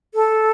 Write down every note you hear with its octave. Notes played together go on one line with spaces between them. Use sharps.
A4